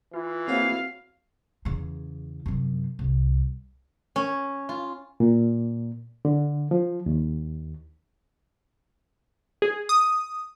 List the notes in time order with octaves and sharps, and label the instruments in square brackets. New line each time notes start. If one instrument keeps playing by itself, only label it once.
[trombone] E3 [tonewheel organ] F4
[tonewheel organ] A#3 E4 G#4 [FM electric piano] C4 F#4 C#5 [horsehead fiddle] F5
[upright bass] E2 C#3
F#2 C3
C2
[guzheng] C#4
F4
[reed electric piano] A#2
D3
F3
D#2
[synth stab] G#4
D#6